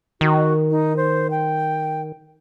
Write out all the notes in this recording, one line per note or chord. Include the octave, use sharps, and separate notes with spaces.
D#3 F#4
D#4
C5
G5